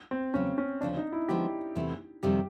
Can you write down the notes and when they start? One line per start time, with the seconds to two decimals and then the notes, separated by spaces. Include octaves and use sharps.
0.11 C4
0.34 E2 C#3 F#3 A#3 C#4
0.58 C#4
0.81 D2 C#3 F3 D4
0.97 D#4
1.12 E4
1.28 D3 F3 G#3 B3 G4
1.75 E2 C3 E3 A3
2.23 F2 C3 D#3 G3 G4